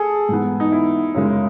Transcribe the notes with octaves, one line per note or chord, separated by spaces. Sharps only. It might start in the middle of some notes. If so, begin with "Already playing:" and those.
Already playing: G#4 A4
G#2 E3 B3
D#4
E4
F#2 C#3 G#3